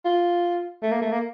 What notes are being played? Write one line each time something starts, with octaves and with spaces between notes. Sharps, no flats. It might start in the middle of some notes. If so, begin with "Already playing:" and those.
F4
A3
A#3
A3
A#3